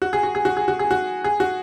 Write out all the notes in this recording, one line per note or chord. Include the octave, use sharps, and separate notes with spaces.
F#4
G#4
F#4
G#4
F#4
G#4
F#4
G#4
F#4
G#4
F#4